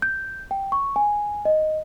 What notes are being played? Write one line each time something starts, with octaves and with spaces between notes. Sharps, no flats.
G6
G5
C#6
G#5
D#5